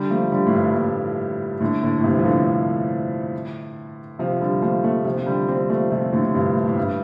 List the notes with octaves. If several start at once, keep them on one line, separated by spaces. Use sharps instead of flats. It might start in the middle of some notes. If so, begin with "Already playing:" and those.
Already playing: D3 G3
F3 A3
D3 G3
A2
G2
A2
A2 D3
A2 D3
A2
G2 C3
F3
A2 D3
C3 F3
D3 G3
F3 A3
F3 A3
C3 F3
F3
D3 G3
G3 C4
F3 A3
C3 F3
A2 D3
D3
G2 C3
A2
A2
G2